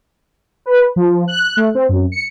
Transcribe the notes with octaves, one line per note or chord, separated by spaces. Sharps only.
B4
F3
F#6
A3
C4
F#2
C#7